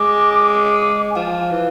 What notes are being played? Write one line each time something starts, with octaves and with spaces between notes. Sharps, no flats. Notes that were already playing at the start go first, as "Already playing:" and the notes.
Already playing: G#3 D6
G#5
F3 F5
E3